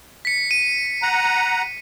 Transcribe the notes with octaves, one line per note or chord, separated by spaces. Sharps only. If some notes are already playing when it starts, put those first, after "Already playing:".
B6 C#7
D#7
F#5 A#5